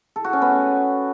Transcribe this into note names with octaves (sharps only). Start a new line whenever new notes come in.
A4
F#4
C#4
B3